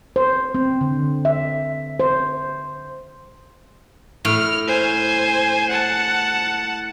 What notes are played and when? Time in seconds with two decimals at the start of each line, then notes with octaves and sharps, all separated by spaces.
0.16 C5
0.55 C4
0.81 D3
1.25 E5
2.00 C5
4.25 A2 F6
4.68 C5 G#5
5.69 F#5 A5